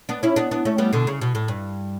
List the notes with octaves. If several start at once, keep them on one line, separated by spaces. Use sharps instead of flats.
B3 D4
C#4 E4
B3 D4
B3 D4
A3 C#4
G3 B3
B2 D3
C#3
B2
A2
G2